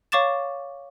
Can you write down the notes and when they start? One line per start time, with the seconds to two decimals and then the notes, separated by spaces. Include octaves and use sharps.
0.12 C#5 F5 C#6 D6 A6 E7